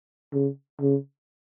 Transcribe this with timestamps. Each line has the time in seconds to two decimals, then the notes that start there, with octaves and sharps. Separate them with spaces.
0.33 C#3
0.81 C#3